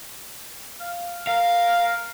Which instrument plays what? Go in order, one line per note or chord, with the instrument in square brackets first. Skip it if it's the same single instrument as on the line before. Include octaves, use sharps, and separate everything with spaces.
[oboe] F5
[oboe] A#4 [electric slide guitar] F5